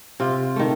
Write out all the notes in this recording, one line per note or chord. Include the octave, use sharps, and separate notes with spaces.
C3 F4
D#3 A3